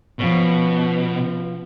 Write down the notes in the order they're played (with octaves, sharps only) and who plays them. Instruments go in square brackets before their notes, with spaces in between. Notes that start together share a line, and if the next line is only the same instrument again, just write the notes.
[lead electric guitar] B2 [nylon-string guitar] F3 B3 C#4